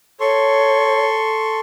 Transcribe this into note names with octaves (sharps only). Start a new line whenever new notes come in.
A4 C#5 C6 C#6